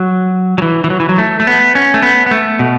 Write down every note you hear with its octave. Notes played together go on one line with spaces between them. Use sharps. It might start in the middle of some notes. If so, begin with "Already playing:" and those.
Already playing: F#3
F#3
E3
E3
F#3
E3
F#3
A3
A3
B3
C#4
A3
B3
B3
A3
B2